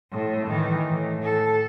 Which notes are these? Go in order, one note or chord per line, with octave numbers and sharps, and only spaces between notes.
A2
D#3 E3
A2
A4